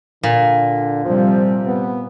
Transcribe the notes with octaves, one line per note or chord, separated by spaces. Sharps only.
A#2 D3
C3 F3 G3
B3